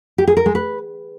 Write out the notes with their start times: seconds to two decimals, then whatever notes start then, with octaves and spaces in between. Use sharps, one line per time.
0.18 G4
0.27 G#4
0.37 A#4
0.46 G#3
0.55 B4